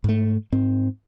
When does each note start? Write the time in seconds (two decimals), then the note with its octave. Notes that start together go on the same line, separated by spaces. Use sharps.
0.04 G#2 A3
0.52 G#2 C4